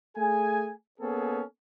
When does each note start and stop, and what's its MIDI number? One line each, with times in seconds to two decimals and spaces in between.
0.18 0.71 57
0.18 0.71 68
0.18 0.71 80
1.00 1.42 58
1.00 1.42 59
1.00 1.42 61
1.00 1.42 68
1.00 1.42 69